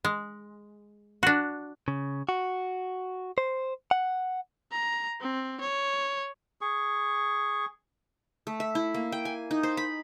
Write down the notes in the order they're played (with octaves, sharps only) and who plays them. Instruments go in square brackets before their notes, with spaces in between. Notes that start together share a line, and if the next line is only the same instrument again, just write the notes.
[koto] G#3
D4 F#4
[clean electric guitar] C#3
F#4
C5
F#5
[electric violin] A#5
C4
C#5
[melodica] G#4 C#6
[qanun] A3
E5
E4
A#3
G5
G#5
D#4
C5
B5